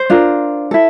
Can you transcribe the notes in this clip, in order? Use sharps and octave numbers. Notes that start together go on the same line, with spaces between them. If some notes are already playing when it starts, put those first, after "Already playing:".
Already playing: C5
D4 F4 A#4
E4 A4